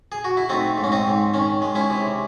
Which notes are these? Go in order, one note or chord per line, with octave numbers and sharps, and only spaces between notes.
G#4
F#4
E4
A3 C4 D#4
G#2
C#4
C4 D#4
G#2
D#3 C#4
G#3
C#4 E4
C3